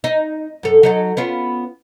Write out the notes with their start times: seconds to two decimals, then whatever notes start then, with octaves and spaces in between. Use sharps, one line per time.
0.04 D#4
0.63 F#2 A4
0.83 F#3 D#4 A4
1.17 B3 C#4 F4